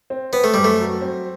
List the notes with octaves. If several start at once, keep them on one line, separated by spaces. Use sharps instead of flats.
C4
B3 C4
A3
F#2 G3
A3
F#3
C4